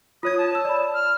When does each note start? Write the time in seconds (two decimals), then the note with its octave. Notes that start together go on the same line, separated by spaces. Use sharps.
0.23 F4 C#5 D#6 G#6
0.38 A5
0.52 C#5 E6
0.65 D5 B5
0.94 F6